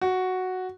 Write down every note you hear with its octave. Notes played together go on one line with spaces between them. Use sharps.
F#4